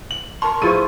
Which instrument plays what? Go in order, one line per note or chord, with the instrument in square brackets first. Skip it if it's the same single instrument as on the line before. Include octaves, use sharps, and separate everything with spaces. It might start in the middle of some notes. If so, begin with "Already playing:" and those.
[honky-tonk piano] F#7
[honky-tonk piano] A#4 C6 [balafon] A5 [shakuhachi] C#6
[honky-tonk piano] F3 D#7 [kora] A3 E4 F4 [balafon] G#4 C5